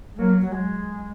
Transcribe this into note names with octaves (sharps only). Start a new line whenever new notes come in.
G#3
F#3 A#3
F#3
G#3